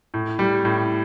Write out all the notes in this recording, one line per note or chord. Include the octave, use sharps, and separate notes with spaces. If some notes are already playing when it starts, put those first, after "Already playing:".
A2
G3
A2